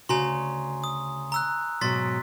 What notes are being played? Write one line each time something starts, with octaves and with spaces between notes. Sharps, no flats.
D2 C#3 F#4 G#5 A#5 C6
D#6
A#5 E6 F#6
G#2 B2 F#3 C6 A6 B6